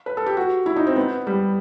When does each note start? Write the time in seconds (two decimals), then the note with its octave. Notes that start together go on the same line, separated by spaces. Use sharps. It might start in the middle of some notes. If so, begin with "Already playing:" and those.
0.06 B4
0.17 A4
0.26 G4
0.37 F#4
0.66 E4
0.76 D#4
0.87 C4
0.96 B3
1.27 G3